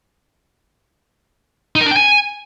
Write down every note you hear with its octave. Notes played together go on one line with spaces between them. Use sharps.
D#4
A#4
D4
G5
G#5